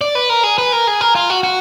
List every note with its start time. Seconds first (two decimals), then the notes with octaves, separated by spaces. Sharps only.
0.01 D5
0.15 B4
0.30 A#4
0.44 G#4
0.58 B4
0.72 A#4
0.87 G#4
1.01 A#4
1.15 F4
1.30 F#4
1.43 F#4